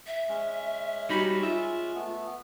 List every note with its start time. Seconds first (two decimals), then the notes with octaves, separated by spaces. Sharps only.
0.06 E5
0.29 G#3 C#4
1.09 G3 D#4 F#4 B5
1.43 F4 E5
1.95 A3 B3